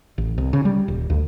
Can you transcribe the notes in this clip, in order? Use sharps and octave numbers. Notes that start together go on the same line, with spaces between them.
A1
C2
C#3
G3
D#1
D2